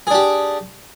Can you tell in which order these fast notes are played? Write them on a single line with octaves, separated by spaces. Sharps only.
G#4 D4 G4